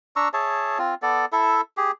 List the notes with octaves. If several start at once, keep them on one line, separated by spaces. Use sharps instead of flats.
D4 A#5 C#6 E6
G#4 C#5 E5 A5
C4 F4
B3 A4 D5
E4 A4 E5
G4 G#4